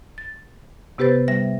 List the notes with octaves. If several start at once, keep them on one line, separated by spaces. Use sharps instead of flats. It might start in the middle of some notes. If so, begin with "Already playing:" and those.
A6
C3 B3 G4 B4 C5 A6
G3 E5 A#6